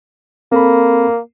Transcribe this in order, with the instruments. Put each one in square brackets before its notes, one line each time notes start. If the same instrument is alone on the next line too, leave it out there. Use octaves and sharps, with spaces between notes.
[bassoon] A#3 [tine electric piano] C4 A4 B5